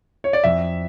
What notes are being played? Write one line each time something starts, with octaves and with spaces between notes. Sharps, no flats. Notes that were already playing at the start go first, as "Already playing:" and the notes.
C#5
D5
F2 E5